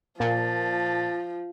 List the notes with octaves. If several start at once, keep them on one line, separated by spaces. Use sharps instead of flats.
A#2 F3 A5